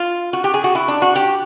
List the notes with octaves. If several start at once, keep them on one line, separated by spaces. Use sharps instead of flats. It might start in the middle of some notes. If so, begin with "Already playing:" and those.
Already playing: F4
F#4
G4
G#4
F#4
E4
D4
F#4
G4